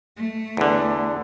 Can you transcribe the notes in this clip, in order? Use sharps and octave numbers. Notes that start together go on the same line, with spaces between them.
A3
E2 D3